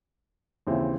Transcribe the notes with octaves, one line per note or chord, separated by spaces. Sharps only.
D#2 C#3 E3 C4 E4